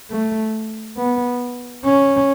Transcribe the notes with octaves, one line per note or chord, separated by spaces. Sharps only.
A3
B3
C#4